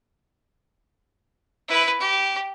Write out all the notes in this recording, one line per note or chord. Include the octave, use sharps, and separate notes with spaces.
E4 B4
G4